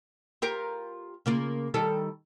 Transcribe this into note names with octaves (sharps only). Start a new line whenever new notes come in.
F4 G4 A#4
C#3 A#3 F4
D#3 G3 A4